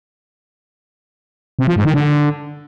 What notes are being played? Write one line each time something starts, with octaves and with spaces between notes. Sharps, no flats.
C3
F3
G#2
D#3
D3